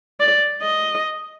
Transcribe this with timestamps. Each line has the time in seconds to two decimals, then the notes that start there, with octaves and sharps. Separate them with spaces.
0.20 D5
0.62 D#5